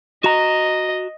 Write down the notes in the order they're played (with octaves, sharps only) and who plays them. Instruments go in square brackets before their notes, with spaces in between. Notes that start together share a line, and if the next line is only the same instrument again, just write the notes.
[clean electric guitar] F#4 A#5 [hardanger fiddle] D#5